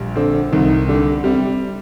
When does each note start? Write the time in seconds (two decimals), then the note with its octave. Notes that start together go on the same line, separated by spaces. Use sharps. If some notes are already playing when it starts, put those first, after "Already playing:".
Already playing: A#1 G3
0.16 D3 C4
0.52 C2 D#3
0.88 D3 G3
1.24 C3 G3